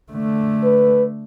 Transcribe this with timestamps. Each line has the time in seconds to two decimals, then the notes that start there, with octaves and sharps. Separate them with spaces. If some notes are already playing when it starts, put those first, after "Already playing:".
0.12 D3 A3
0.63 B4